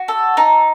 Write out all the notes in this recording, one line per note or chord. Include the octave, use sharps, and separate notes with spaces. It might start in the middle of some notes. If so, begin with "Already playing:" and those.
Already playing: F#4
A4
D#4